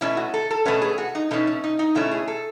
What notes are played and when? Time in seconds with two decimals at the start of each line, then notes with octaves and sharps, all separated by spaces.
0.01 B2 A3 C#4 E4
0.17 F#4
0.34 A4
0.51 A4
0.65 B2 A3 C#4 B4
0.82 G#4
0.98 F#4
1.15 D#4
1.31 B2 A3 C#4 D#4
1.47 C#4
1.64 D#4
1.79 D#4
1.95 B2 A3 C#4 E4
2.11 G#4
2.28 A4